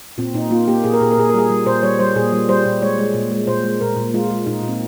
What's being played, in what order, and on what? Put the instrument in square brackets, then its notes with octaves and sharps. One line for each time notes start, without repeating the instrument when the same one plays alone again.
[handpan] A#2 C4
A#2 D#4
A#3 F4
A#3 G4
A#2 G#4
A#4
A#2 G#4
A#4
A#2 G#4
A#4
G3 G#4
G3
A#2 C5
G3 C#5
G3 C5
A#2 G#4
G3
G3 C5
A#2
G#3 C#5
G#3
A#2
G#3
A#2 C5
G#3
A#2 A#4
A#2
G#3 F4
G#3
A#2 D#4
A#2
C4